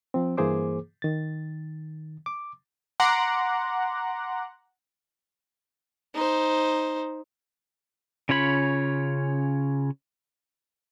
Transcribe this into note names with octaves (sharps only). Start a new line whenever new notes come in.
F3 C4
G2 E3 A#3 G#4 C5 D6
D#3 A6
D6
F#5 A#5 C6 D6
D#4 C5
C#3 C#4 F4 C#5 B5